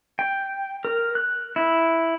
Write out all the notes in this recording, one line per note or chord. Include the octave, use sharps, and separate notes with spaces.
G5
A#4
F#6
E4